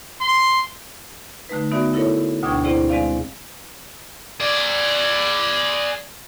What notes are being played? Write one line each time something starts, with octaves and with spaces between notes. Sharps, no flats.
C6
D3 A3 D#4 B4
B3 D#4 F#4 D5 E5
E4 A4 A#4 C#5
D2 B2 D4 G5 C#6 G#6
C4 E4 G#4 C5 D5
G#3 C4 D5 F5
G#4 D5